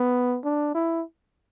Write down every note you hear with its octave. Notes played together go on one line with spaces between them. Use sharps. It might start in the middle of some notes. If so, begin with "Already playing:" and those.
Already playing: B3
D4
E4